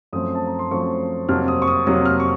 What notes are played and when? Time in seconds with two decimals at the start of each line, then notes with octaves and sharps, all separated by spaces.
0.13 F#2 F3 A3 C4 D#6
0.35 A5
0.47 A#5
0.59 C6
0.71 F#2 F3 A3 C4 C#6
1.28 F2 C3 F#3 A#3 F6
1.48 D#6
1.62 C#6
1.68 D#6
1.87 F2 C3 F#3 A#3 D#6
2.05 F6
2.20 C#6